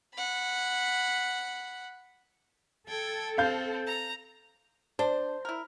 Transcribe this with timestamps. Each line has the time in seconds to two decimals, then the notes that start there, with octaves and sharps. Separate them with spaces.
0.14 F#5 B5
2.88 A4 G5 G#6
3.38 C4 F5 G6
3.87 A#5
4.99 D4 C5
5.45 E4 A#4